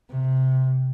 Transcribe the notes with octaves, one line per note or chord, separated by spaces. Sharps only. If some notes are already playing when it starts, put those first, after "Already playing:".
C3